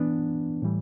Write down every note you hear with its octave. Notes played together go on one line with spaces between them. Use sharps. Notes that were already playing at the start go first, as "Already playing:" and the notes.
Already playing: E3 B3 D4
A2 E3 G3